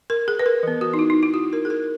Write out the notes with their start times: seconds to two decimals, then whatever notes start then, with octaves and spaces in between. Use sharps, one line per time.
0.10 A#4
0.28 G#4
0.39 B4
0.46 A#4
0.63 E3 B3
0.81 F#4
0.94 D#4
0.99 E4
1.10 D#4
1.23 E4
1.34 F#4
1.53 A#4
1.65 G#4
1.70 A#4